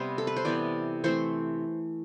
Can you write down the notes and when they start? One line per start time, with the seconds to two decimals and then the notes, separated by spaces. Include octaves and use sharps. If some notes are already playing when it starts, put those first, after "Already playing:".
Already playing: C3 G3 B3 C5
0.18 A4
0.27 B4
0.37 C5
0.45 C3 E3 B3 D5
1.04 E3 A3 C4 C5